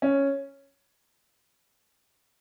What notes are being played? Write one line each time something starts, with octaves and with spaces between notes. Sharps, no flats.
C#4